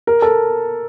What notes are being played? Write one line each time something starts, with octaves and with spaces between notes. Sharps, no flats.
A#4
A4